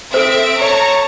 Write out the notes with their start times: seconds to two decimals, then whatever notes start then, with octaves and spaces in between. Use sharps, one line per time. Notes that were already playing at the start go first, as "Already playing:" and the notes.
0.14 C4 A4 C5 E5 D7
0.62 C#5 A5 A#5 C#6